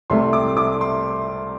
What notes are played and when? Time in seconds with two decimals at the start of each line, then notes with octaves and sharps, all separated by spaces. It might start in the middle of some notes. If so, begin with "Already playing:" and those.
0.10 C2 C3 A3 C6
0.33 D6
0.57 D6
0.81 C6